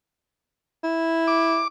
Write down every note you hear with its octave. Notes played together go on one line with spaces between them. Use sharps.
E4
D6